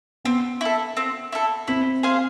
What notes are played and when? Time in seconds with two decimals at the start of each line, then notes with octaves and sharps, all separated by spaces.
0.25 B3 C4
0.61 E4 A4
0.97 C4
1.32 E4 A4
1.68 C4 E4
2.03 G#4 C5 F5